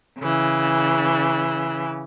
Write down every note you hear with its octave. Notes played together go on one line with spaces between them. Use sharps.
C#3 E3